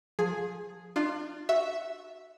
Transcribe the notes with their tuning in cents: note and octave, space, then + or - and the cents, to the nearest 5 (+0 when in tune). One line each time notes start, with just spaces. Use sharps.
F3 +25 G#4 +0
D4 +35 F4 +0
F#4 +0 E5 +0